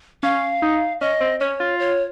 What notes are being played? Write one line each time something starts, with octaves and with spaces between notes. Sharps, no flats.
C#4 F5
D#4
C#4 D#5
C4
C#4 C#5
F4
C#5